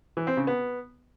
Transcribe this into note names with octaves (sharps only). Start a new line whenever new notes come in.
E3
C4
C#3
B3